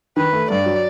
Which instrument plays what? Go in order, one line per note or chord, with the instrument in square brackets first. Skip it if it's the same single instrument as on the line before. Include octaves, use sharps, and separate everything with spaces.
[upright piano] D#3 [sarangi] B4
[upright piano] A3
[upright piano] G2 [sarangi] D5
[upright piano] F#3